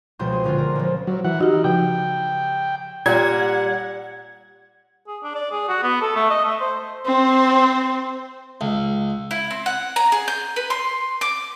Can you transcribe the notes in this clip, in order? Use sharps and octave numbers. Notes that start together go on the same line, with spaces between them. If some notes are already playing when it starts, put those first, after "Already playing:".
C#2 B2 F3 C4 C6 G6
G#4
A#2 D3 C#4 F4
A#4
C#2 F3
F#3
E3 F#5
D#4 F#4 G4
C#3 F3 G5
A#2 G3 F#5 G#6
G#4
D4
D5
G#4
F#4
B3
A4
A3
D#5
A3
C5
C4 C5
C#2
E4
C4
F#5
A#5
G#4
G6
B4
C6
D6